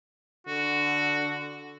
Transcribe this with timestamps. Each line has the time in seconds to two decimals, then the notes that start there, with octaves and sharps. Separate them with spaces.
0.47 D3 F#4